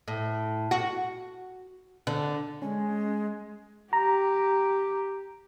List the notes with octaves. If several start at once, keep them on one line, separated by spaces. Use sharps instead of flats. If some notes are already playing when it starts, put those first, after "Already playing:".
A2
F#4
D3
G#3 C#4
G4 A#5